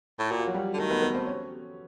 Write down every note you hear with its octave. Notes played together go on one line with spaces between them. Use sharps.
A2
A#2 F#4
F4
F#3 F#4
G3 G4
D3
D#3 A3 A4
B3 B4
B3 B4
C4 C5
C#4 C#5